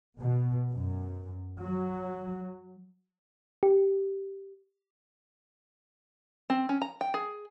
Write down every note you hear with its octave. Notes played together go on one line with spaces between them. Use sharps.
B2
F#2
F#3
G4
C4
C#4
A#5
G5
G#4